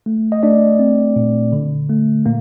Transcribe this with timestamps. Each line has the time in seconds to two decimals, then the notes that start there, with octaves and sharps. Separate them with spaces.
0.06 A3
0.32 D#5
0.43 A3 D4 D5
0.79 C4
1.16 A#2
1.52 D3
1.90 A3
2.26 A#2 A#3